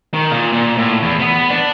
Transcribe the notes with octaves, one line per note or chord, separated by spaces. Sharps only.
D#3
A#2
A#2
A2
E2
B3
D4